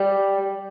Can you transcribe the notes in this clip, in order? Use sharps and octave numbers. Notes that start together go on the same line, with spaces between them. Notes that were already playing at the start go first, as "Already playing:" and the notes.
Already playing: G3